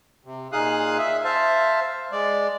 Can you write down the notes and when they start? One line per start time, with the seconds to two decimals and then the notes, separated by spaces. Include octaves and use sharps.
0.25 C3
0.53 A#2 D#4 G#4 F5 D#6 F#6
0.98 E5
1.24 C5 E5 F5 A5
2.12 G#3 D5